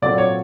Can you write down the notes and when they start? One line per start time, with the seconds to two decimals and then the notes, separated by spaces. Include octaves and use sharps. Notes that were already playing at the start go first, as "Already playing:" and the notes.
0.02 A#2 F#3 A3 C4 D5
0.18 C#5